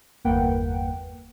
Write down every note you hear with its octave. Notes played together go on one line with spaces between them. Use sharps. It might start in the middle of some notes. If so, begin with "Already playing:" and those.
G1 E2 A#3 B4 F#5 G5